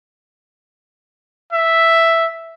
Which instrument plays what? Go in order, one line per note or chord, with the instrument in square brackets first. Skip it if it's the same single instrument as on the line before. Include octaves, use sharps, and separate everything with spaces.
[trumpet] E5